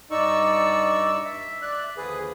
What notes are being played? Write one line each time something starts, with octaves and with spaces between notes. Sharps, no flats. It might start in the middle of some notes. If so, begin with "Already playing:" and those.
G2 D#4 D5 C#6 E6
E5
D5 F#6
D#2 D3 F3 G#4 B4